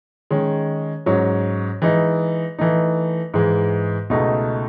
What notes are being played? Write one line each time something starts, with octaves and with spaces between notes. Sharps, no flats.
D#3 G#3 C#4
G#2 F#3 C#4
E3 G#3 D#4
E3 A3 D#4
G#2 E3 G#3
C#2 B2 A3 D#4